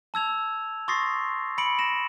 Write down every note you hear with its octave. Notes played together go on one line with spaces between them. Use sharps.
A5 E6 G#6 F7
C6 C#6 D#6 A6 A#6 C7
B5 C#7 D7 F#7
A#6 E7